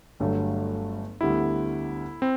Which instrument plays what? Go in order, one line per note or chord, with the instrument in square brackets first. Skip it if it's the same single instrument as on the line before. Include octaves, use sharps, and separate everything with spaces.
[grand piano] G1 G2 F#3 A3
[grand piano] D2 D3 G3 B3 [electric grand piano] E4
[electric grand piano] C4